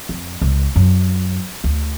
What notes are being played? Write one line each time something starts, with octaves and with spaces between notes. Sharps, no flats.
F2
C#2
F#2
D2